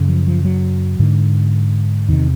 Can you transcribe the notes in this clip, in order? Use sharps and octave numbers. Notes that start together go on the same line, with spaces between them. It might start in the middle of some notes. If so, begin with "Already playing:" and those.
Already playing: F#2 C#3
F3
F3
F#3
G#2 D3
E2 C3 D#3